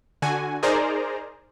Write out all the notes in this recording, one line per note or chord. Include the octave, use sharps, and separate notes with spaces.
D3 F#4 G#5
D#4 G#4 A#4 C5 D5 A#5